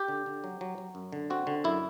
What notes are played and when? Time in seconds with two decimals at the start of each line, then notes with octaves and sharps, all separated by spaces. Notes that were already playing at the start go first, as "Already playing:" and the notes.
Already playing: G4
0.08 D3
0.26 D3
0.44 F#3
0.61 F#3
0.78 F#3
0.95 F#2
1.13 D3
1.30 C4 F#4
1.47 D3
1.64 F#2 E4